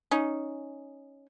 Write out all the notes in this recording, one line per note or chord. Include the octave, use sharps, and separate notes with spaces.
C#4 D#4